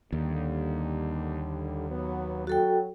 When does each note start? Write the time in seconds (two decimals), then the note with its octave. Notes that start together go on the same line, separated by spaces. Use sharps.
0.12 D#2 D3 G3
1.90 F#3 B3
2.47 F#3 F#4 A4 G5